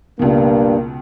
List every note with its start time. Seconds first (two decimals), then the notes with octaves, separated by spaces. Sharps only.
0.19 C#2 G2 B2 A#3